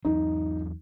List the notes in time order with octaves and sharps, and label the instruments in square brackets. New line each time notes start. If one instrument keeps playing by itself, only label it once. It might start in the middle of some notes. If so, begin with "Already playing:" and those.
[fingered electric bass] E2 F#3 [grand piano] D#4